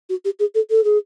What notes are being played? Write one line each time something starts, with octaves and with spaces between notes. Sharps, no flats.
F#4
G4
G#4
A4
A4
G#4